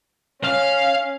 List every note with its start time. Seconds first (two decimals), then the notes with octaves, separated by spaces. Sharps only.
0.44 C#4 F5